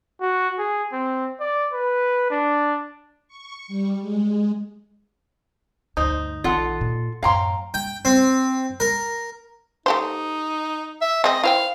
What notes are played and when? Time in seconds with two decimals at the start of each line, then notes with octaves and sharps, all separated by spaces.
0.21 F#4
0.58 G#4
0.93 C4
1.40 D5
1.72 B4
2.31 D4
3.28 C#6
3.68 G3
4.01 G#3
5.97 D2 G2 D#4 C5
6.44 A#1 D#3 F4 A4 F#5
6.81 A#2
7.23 F#2 A2 C#4 F5 G5 A#5 C6
7.74 G5
8.05 C4
8.80 A#4
9.86 A3 D#4 G4 C5
11.01 E5
11.24 G#3 C4 D#5
11.43 E4 C5 F5 G5